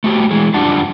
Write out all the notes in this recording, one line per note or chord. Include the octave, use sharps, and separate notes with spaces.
A3 F#4 G4
E3 G#3
F#2 G3 D4 F4 F#5 A5